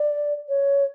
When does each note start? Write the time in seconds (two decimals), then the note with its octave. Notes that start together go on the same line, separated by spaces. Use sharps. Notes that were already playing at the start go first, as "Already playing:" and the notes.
Already playing: D5
0.49 C#5